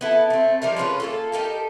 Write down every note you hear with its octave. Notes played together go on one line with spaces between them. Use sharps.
B3 E4 A4
A3 C4
F3 G3 D#4 A#4
G#3 C#4 F4 B4
A#3 F4 A4
D#4 G4 A4 A#4